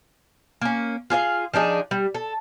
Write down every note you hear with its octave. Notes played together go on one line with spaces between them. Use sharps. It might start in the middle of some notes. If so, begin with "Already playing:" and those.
A#3 C#4
F4 G#4 C#5 F5
F3 D4 D#4 G#4
G3
A4